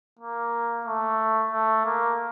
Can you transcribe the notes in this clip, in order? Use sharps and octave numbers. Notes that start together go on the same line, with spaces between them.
A#3
A3
A3
A#3